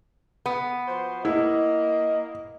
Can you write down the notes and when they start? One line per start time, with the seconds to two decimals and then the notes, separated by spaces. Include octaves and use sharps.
0.46 B3
0.87 F3 F#4 C5
1.25 A#3 E4 D#5